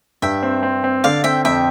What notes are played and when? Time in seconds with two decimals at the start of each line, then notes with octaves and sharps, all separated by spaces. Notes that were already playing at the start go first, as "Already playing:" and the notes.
0.22 G2 E5 G5
0.43 C4
0.63 C4
0.84 C4
1.04 D3 D5 F5
1.24 C4 E5 G5
1.45 F2 E5 G5